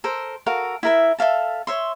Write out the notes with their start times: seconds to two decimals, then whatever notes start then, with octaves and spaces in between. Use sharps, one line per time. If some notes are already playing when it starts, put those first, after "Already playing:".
0.04 A4 A#4 C5
0.46 F#4 A4 A#4 F5
0.83 E4 A#4 E5
1.19 A4 E5 F5 A5
1.67 C#5 E5 C6